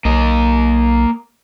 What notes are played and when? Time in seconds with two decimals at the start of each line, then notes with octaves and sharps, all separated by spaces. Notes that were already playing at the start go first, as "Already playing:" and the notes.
0.05 B1 A#3 D#5